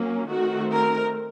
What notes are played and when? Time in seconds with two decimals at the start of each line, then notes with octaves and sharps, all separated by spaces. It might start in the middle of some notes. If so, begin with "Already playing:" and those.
Already playing: F#3 A#3 C#4
0.27 D#3 A3 C4 F#4
0.70 A#4